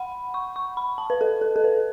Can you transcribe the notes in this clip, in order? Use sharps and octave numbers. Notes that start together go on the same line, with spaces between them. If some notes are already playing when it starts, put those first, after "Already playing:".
Already playing: F#5 B5
C#6
C#6
B5
A5
B4
A4
A4
A4
B4